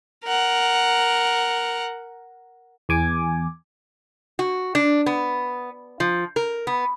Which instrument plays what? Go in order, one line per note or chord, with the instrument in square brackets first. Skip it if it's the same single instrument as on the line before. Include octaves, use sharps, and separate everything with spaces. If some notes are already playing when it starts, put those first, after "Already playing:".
[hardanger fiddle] A#4 F#5
[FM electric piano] E2 G#5 D6
[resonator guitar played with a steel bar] F#4
D4
B3
F3
A#4
B3